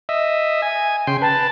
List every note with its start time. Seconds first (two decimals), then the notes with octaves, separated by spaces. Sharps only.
0.09 D#5 E5
0.62 G#5
1.07 C#3 G5 C6
1.22 B4 A5